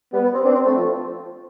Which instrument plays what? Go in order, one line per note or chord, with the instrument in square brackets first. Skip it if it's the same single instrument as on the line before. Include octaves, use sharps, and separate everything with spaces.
[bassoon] G3 [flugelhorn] B3
[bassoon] B3
C4
[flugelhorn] C4 [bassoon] D4
[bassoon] C4
A3
F3